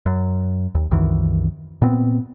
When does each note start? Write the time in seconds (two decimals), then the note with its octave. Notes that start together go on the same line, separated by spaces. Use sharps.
0.06 F#2
0.75 D#2
0.91 C2 F#2 D#3 E3
1.82 A#2 B3 C4